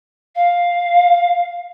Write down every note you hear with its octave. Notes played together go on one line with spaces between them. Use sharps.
F5